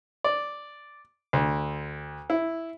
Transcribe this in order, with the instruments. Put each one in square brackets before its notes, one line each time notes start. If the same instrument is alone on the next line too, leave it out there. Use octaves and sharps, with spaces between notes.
[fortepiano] D5
D2
E4